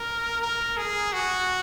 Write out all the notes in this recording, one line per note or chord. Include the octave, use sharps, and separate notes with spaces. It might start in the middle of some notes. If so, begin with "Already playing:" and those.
Already playing: A#4
A#4
G#4
F#4